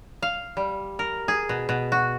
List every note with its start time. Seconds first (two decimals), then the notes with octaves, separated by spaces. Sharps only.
0.22 F5
0.57 G3
0.99 A#4
1.28 G#4
1.49 B2
1.69 B2
1.92 F#4